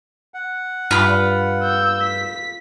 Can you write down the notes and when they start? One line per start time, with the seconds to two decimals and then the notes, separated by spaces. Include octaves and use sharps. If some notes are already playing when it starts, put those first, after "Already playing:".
0.34 F#5
0.91 G2 F4 B5
1.63 E6 G6
2.03 B6